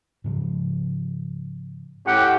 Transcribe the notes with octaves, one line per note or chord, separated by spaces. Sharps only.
G#2 C#3 F3
A2 C#4 G4 F#5